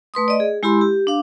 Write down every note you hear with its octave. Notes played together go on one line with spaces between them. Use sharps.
A3 B4 C6 D#6
D5 D#5
G#4
G#3 E4 G4 B5 C6 E6
G4
D4 F5 D6